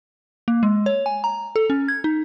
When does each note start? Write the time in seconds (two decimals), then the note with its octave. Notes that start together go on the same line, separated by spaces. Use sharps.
0.48 A#3
0.63 G#3
0.86 C#5
1.06 G#5
1.24 A#5
1.56 A4
1.70 C#4
1.88 G#6
2.04 D#4